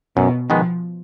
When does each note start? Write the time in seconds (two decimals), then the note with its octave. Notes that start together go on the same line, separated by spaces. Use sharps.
0.17 F#2 B2
0.50 D#3 F3 G#3 B3